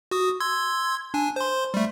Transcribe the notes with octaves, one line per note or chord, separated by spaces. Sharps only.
F#4 D#6
C6 E6 G#6
D4 G#5
C5 C6
G3 A3